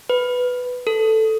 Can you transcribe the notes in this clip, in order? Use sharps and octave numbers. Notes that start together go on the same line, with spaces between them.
B4
A4